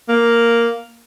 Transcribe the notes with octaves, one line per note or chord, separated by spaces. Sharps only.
A#3